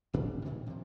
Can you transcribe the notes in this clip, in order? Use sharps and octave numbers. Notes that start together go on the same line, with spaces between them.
A1 A2 D4
A#2 D#3 E3
C3 F3